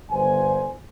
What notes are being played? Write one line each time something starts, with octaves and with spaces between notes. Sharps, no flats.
G1 C5 G#5